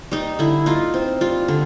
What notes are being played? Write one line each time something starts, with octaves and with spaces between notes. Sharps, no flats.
G3 D#4
D3 E4
D#4 F4
C4
G3 F4
D3